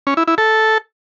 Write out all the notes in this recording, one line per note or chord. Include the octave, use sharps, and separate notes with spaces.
C#4
E4
E4
A4